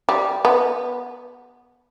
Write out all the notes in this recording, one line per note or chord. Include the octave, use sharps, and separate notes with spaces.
G3
B3